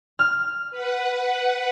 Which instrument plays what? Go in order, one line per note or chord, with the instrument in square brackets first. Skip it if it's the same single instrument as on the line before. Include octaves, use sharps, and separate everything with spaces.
[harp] F6
[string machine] B4 F#5